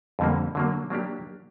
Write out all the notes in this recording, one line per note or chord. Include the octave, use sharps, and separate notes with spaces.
F2 D3 G3 A#3
D3 F#3 A#3
F#3 A#3 D4 G4